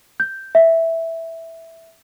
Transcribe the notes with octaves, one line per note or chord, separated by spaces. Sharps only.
G6
E5